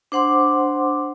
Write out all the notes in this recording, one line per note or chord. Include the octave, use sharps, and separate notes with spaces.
D4 C5 F#5 C6 D6